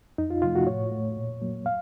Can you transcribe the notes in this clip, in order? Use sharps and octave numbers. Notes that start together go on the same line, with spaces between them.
F2 D#4
F4
C3 F3 A3 F4
F#4
A2 C#5
A3
A#2
F#3 A#3
F5